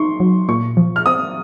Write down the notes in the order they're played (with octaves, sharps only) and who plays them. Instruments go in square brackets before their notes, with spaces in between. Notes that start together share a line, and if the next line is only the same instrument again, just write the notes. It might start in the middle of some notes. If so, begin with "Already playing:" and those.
Already playing: [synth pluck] D#4 [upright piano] C6 C#6
[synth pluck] F#3
[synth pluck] A#2 [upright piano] C#6
[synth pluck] F3
[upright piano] F6
[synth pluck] C4 [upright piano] D#6